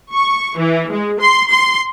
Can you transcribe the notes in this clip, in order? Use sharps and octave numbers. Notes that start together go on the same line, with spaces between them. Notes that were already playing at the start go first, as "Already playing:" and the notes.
C#6
E3
G#3
C6
C6